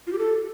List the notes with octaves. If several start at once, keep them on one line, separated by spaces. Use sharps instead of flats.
F4
G4
A4